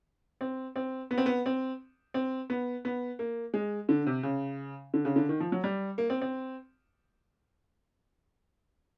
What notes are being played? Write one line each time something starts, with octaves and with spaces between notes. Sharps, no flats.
C4
C4
B3
C4
B3
C4
C4
B3
B3
A#3
G#3
D3
C3
C#3
D3
C#3
D3
D#3
F3
F#3
G3
A#3
C4
C4